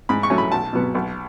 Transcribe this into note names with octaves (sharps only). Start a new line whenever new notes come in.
G#2 B5
C#6
F#3 A3 C#4
B5
B1 A5
B2 F#3 B3
B1